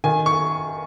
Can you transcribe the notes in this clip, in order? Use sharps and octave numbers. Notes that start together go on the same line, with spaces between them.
D#3 G#5
C#6